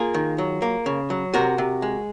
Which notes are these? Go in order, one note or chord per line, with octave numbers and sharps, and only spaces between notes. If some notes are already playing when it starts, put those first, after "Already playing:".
Already playing: A#3 F4 G#4
D#3
F#3
A#3
C#3
F#3
C3 F#4 A#4
C3
G#3